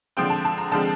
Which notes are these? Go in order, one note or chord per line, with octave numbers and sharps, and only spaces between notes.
D3 F3 G#3 C4 G5
A5
A5
A#5
D3 F3 G#3 C4 A5